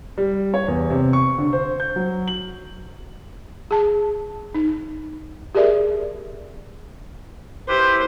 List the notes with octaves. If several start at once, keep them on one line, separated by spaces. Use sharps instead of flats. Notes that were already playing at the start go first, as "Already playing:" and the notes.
G3
C#5
E2
C3
C#6
D3
C5
G6
F#3
F#7
G#4 A5
D#4
G4 G#4 A#4 D5 E5
E4 G4 B4 C5